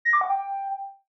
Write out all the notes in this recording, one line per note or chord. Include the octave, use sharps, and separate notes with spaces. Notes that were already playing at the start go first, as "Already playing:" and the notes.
A#6
D6
F#5
G5